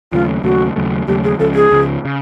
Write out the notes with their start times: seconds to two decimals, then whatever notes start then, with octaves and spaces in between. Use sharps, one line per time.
0.12 D#2 C#3 F#3 A3 F4
0.43 D#2 C#3 F#3 A3 F#4
0.76 D#2 C#3 F#3 A3
1.07 D#2 C#3 F#3 A3 G4
1.24 G#4
1.39 C#2 C#3 F3 A4
1.55 G#4
1.71 C#2 C#3 F3
2.05 C#3